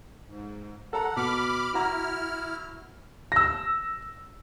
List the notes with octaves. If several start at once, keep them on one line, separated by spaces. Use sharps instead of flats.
G#2
A4 F#5 A#5
B2 B5 D6 F6
E4 F#4 A#5 F6
E6 A#6